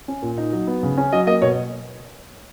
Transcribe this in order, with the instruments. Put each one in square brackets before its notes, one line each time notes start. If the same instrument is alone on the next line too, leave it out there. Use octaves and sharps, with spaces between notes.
[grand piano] C#4
A#2
D#4
F#3
B3
C#3
C#4
F#3 D#5
A#3 D#5
B2 C#5